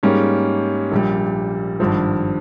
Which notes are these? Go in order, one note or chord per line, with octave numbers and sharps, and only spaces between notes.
G#2 G3 A#3 C#4
A#1 A#2 G3
G#1 G2 F3